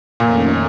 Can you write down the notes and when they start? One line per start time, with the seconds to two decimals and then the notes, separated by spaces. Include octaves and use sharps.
0.20 F2 A#2 D#3 A3 C#4